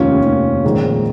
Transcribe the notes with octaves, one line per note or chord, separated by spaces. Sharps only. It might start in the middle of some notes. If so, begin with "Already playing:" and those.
Already playing: F1 D#2 D#3 C#4 F4
F1 D#2 D#3
A#1 G#2 D#3